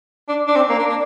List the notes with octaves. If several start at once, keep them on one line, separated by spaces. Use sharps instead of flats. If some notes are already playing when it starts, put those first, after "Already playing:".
D4
D4
C4
A#3
D4
D4